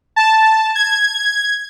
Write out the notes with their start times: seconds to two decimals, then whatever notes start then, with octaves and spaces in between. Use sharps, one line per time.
0.16 A5
0.75 G#6